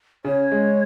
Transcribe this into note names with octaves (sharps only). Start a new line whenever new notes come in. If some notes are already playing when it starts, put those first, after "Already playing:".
C#3 C#5
G#3